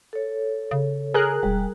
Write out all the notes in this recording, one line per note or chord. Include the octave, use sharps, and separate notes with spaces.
A4 C#5
C#3
G#4 A#4 F#6
E1 G3